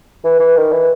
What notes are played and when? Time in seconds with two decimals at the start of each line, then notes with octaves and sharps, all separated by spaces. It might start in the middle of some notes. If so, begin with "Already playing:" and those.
0.24 E3
0.39 E3
0.57 D#3
0.72 E3